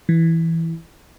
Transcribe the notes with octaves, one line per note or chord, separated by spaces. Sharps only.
E3